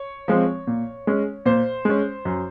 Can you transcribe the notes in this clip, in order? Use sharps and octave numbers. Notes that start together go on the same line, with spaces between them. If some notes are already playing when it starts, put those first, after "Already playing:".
Already playing: C#5
F3 G#3 C4
A#2
G#3 C#4
A#2 C5
G#3 C#4
F#2